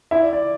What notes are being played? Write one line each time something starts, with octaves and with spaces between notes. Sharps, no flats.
E4 E5
D5
D5